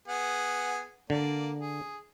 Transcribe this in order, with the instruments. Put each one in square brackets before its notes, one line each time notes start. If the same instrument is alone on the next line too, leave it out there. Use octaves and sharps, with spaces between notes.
[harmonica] B3 G#4 F#5
[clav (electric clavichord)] D3 [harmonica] A#3 D5
[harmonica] G#4